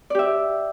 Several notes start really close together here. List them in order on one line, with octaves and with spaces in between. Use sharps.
D5 G4 E5